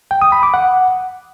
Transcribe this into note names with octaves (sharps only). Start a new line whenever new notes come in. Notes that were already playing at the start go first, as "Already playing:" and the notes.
G5
D#6
B5
D6
F#5